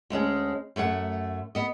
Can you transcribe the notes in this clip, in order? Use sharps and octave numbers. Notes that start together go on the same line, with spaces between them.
D2 G#3 C#4 G#4
F#2 A3 C5 F#5
B3 D#5